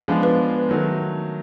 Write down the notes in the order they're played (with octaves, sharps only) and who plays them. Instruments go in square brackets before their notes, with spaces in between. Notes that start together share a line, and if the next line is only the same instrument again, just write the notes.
[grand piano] F3 G#3 B3 D4 F4
[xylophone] B4
[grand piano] D#3 F#3 A3